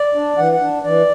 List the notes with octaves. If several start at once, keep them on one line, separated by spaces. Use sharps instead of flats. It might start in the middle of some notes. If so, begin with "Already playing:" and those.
Already playing: D5
D4
E3 F#5
F#5
D4
E3 D5